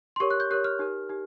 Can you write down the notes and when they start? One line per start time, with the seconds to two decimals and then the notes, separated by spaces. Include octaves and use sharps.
0.16 C6
0.20 G4 A#4 C#5 C#6
0.30 F#6
0.40 G6
0.51 G4 A#4 C#5 F#6
0.64 F6
0.79 D#4 G4 A#4
1.09 D#4 G4